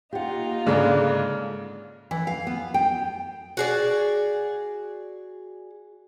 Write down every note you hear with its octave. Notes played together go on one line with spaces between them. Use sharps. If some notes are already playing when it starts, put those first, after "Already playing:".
A#3 D#4 F4 G4 F#5
G#2 C#3 G#3 D4 A4 D5
E3
F5
B3
G5
F#4 G#4 D5